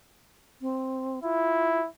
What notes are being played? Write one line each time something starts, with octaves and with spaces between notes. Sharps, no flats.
C4
E4 F4